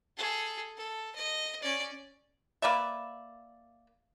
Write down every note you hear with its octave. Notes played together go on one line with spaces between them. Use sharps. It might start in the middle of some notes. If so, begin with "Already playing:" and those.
G#4 A4
A4
D#5
C#4 D5
A#3 B4 D5 E5